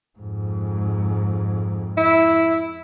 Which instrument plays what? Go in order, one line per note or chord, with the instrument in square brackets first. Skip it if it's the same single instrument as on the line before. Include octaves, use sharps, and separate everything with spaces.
[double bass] F2 G#2
[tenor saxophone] E4